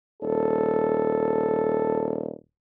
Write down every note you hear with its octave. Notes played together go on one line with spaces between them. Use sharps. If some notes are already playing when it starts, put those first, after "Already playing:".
D#1 A4